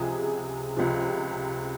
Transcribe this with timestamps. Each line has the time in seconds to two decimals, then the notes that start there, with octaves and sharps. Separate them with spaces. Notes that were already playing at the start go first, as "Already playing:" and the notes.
Already playing: C#2 C3 F3 G#4
0.77 C#2 C3 F3